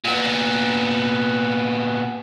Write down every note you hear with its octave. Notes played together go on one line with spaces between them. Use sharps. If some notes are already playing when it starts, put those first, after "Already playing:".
A#2 B3